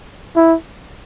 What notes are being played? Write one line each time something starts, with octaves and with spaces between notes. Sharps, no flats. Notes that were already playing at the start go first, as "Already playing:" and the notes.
E4